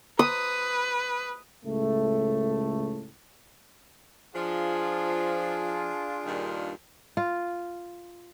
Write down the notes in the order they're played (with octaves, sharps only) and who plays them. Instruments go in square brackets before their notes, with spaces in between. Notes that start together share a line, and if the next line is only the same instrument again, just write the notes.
[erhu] B4 [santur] D#6
[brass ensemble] C#2 A2 A3
[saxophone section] F3 [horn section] D4 F4 [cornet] G#4
[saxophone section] G2 A#2 D#3
[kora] F4